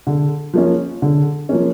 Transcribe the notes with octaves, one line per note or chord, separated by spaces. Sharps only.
D3
F3 A#3 C#4
D3
F3 A#3 C#4